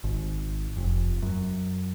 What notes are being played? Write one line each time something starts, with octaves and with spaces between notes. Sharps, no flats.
G#1
F1
F#2